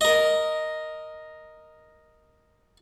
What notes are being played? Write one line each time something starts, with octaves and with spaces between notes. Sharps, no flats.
A#4 D#5